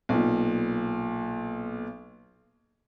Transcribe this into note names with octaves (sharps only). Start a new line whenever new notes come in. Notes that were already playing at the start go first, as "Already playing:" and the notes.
B1 A#2